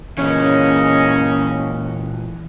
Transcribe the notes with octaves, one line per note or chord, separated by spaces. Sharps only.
A#2 C#3 E3 A#3 C#4 D#5